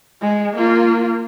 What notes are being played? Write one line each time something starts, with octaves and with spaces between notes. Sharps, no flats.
G#3
A#3 F4